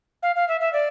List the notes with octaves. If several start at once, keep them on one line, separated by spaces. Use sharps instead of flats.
F5
F5
E5
E5
D5